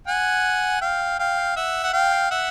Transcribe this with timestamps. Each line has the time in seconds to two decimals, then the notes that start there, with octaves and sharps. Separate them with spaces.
0.07 F#5 G#5
0.81 F5 G5
1.19 F5 G5
1.56 E5 F#5
1.84 F#5
1.93 F5 G5
2.31 E5 F#5